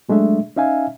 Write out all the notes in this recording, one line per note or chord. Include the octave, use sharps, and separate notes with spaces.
F#3 G#3 A3 D4 E5
C#4 D#4 E5 F5 G#5